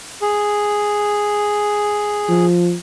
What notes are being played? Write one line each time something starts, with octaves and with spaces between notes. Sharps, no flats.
G#4
F3